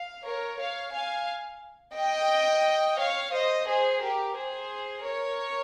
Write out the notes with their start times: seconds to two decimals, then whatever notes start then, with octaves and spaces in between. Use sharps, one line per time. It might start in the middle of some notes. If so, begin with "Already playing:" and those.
Already playing: F5
0.24 A#4 C#5
0.58 C#5 F5
0.92 F5 G#5
1.95 D#5 G5
2.99 C#5 F5
3.33 C5 D#5
3.68 G#4 C5
4.01 G4 A#4
4.36 G#4 C5
5.04 A#4 C#5